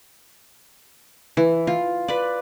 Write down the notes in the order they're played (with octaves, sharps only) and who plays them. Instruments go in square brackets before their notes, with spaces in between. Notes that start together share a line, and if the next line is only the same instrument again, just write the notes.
[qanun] E3
F4
B4 D5